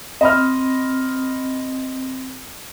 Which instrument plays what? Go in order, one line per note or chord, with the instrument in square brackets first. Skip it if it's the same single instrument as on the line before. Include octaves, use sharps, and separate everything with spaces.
[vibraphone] C4 [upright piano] D#5 B5 F6